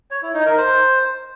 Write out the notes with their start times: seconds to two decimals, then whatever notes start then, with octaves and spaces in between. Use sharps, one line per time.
0.11 C#5
0.23 E4
0.34 D#4
0.46 A#4
0.58 C5